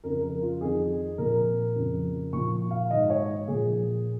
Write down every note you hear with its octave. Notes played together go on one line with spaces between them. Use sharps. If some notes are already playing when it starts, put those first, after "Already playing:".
F2 C#3 F3 A#4
A#4
F4
F2 D#3 G#4
A#2 F3 A#4
F2 C#3 F3
A#2 F3 C#6
F5
G#2 D#3 D#5
C#5
A#2 F3 G#4